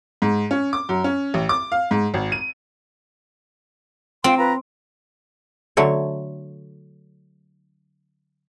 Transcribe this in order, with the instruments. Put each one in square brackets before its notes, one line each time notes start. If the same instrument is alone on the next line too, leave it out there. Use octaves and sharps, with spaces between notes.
[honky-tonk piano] G#2
C#4
D6
F#2
C#4
A1
D6
F5
G#2
G#1
D#7
[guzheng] C4 [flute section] F4 G5 C6
[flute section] F4 B4 A#5
[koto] D3 F#3 A3 C#5